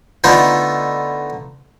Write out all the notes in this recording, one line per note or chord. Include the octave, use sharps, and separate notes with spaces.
D3 A3 B3 D#4 F4